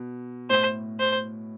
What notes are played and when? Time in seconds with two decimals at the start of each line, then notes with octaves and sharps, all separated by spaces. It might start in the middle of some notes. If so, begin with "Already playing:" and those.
Already playing: B2
0.50 A2 C5
0.99 C5